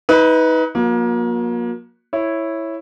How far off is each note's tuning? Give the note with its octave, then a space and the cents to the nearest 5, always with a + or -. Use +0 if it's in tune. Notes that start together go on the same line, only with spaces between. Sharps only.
D#4 +35 B4 +0
F#3 -40 A#3 +30
E4 +0 C#5 -10